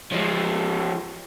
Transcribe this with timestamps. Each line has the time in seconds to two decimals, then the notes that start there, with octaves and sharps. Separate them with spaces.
0.12 F3 G#3